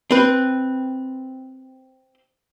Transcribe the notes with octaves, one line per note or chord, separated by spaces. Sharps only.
C4 B4